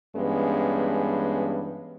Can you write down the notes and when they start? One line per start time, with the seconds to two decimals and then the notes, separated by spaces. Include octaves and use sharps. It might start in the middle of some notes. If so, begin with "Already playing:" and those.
0.16 G2 E3 G#3 B3 C#4